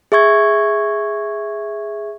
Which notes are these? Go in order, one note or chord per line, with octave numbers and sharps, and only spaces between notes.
G#4 E5 C#6 G#6